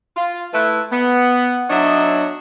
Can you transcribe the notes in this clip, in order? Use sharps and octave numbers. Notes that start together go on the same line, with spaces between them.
F4
A3 E4 B4
B3
F#3 D4 D#4 C#5 D#5 E5